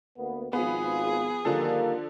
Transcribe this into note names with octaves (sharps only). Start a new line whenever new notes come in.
D2 A#3 B3
G#1 F3 B3 F4 G#4
D3 D#3 F3 G3 A#3 A4